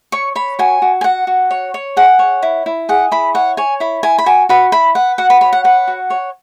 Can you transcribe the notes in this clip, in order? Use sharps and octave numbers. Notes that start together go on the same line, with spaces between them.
C#5 C#6
C#5 B5
F#4 G#5
F#4
G#5
F#4 F#5
F#4
C#5
C#5
G#4 F#5
C#5
E4
E4
G#4 F#5
E4 B5
C#5 F#5
C#5 G#5
E4 B5
E4 G#5
B5
F#4 G#5
F#4 B5
E4 B5
B4 F#5
F#4 F#5
B5
C#5 B5
F#5
B4 F#5
F#4
C#5